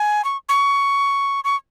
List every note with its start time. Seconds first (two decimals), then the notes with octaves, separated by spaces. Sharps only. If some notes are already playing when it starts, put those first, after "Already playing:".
Already playing: G#5
0.24 C#6
0.49 C#6
1.44 C#6